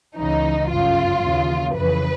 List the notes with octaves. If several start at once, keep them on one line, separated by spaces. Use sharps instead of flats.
C#2 C#3 E3 D#4
G1 F#2 C#3 F4
D#2 C#3 E3
F2 C#3 E3 B4